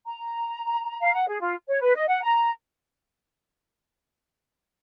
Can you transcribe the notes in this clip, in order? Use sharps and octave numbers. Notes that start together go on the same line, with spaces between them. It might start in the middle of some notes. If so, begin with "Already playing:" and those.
A#5
F5
F#5
G#4
F4
C#5
B4
D#5
F#5
A#5